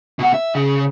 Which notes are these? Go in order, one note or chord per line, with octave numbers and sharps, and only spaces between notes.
B2 F#5
E5
C#3